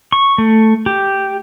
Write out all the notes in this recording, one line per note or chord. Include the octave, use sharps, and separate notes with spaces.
C#6
A3
G4